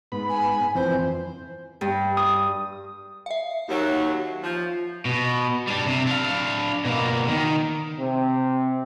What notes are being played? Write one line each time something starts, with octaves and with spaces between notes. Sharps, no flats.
G#2 B3 B5
G#5
F2 E3 C4 C5
G2
D#6
E5 F5
D#2 F#3
F3
B2
G3 D4
C3
D4 F5
B2 A#3
D#3
C3